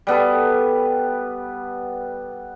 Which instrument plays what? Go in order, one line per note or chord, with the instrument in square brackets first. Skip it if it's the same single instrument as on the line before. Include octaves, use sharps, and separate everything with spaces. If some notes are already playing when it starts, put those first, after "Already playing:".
[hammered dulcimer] G3 B3 A4